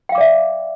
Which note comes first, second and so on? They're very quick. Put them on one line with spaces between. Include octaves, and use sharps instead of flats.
G5 F5 D6 D5 E5